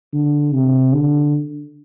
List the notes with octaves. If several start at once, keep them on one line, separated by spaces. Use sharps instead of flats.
D3
C3
D3